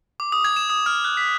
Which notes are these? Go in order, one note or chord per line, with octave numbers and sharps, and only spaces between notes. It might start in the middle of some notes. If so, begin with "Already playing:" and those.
D6
D#6
G#6
E7
D#6
F6
F#6
B6